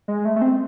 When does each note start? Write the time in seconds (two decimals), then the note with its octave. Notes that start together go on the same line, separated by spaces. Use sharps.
0.08 G#3
0.25 A3
0.36 A3
0.42 C4